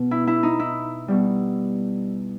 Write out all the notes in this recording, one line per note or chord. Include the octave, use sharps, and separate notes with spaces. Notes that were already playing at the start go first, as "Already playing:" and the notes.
Already playing: B2
E4
E4
D#4
E4
B2 G3